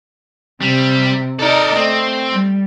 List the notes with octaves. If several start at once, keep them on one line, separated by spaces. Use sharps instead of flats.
C3 G3
D#4 A4 A#4 D5 D#5
A3 C4
G3